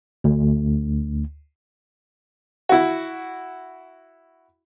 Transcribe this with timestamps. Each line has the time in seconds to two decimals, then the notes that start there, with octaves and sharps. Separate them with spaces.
0.24 D2
2.69 E4 F#4